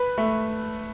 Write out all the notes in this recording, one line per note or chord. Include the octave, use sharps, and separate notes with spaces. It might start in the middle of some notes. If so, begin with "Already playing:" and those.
Already playing: B4
A3